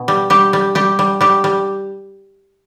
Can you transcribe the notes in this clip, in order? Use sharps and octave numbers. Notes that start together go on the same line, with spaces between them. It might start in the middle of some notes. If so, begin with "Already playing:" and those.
Already playing: B2
G3
G3 G4
G3
G3 G4
G3
G3 G4
G3